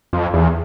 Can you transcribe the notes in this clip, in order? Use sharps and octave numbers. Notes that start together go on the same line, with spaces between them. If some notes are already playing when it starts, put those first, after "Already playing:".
F2
E2